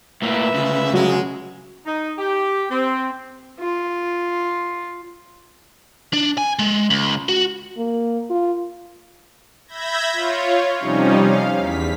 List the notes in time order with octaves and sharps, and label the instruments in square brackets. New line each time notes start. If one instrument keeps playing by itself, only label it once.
[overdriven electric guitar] A2 A#3 [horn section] B4 E5
[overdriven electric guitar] D2 C#3
[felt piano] F#3 [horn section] G#3
[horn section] D#4
G4
C4
[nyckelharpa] F4
[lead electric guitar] D4
G#5
G#3
C#2
F#4
[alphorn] A#3
F4
[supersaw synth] E5 B5 G6 G#6 A#6
F4 C#5
C3 F3 G3 C#4 D#4
F5
E2 B6